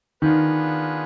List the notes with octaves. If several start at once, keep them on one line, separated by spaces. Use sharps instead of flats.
D#3 B3 D4 F4 G#4 B4